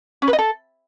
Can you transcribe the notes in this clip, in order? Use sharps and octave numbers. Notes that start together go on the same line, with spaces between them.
C#4
B4
D#5
A4